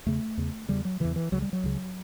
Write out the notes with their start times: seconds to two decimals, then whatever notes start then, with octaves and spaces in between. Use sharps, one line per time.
0.06 E2 C#3 A3
0.37 E2 C#3
0.69 E2 C#3 G3
0.85 F#3
1.00 E2 C#3 E3
1.16 E3
1.32 C#2 C#3 F#3
1.42 G3
1.53 F#3
1.63 C#2 C#3